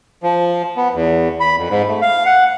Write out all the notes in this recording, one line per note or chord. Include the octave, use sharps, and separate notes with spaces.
F3
B3
E2
B5
F2
G#2
A3
F5
F#5